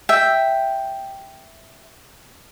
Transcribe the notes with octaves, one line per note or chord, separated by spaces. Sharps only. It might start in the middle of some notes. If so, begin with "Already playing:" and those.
E5 G5